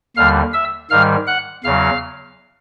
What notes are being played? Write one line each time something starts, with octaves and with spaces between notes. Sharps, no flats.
D#2 D3 G3 F5 F6
E5 E6
G#2 D#3 G3 F5 F6
F#5 F#6
E2 C#3 F#3 F5 F6